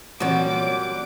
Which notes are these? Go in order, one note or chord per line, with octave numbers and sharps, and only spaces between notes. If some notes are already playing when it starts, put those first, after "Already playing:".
A#2 E3 F#3 G3 C4 C#4 G4 D6